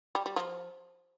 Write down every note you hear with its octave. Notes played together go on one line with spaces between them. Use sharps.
G3
G3
F3